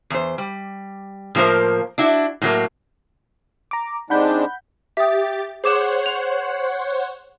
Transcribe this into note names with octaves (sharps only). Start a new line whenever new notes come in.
E2 C5
G3
A2 F3 A#3 A#4 C5
D4 E4 F#4
A2 F#3 A#3
A#5 D6
C3 G#3 D4 D#4 F#5 B5 G6
G4 E5 D#6 A6
G#4 C5 C#5 F#5 D6 E7
F7